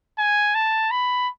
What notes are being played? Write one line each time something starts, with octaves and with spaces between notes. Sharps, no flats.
G#5
A5
B5